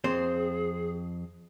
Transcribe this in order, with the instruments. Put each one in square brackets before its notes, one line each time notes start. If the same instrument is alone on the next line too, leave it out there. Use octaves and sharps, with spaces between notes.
[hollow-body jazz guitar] F2 C4 C5 [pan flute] G#4